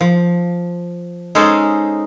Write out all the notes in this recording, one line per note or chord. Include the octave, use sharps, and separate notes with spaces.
F3
G#3 C#4 D#4 A4 C5